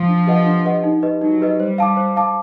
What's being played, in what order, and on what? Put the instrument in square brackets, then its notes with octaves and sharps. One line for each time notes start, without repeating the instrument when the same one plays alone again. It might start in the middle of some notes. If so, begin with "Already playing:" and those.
Already playing: [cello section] F3
[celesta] D4
G4 B4 D#5 F#5
D4
G4 B4 D#5 F#5
D#4
G4 B4 D#5
[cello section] F#3 [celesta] D#4
[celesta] G4 B4 D#5
[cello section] G3 [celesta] C5
[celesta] F5 A5 D6
C5
F5 A5 D6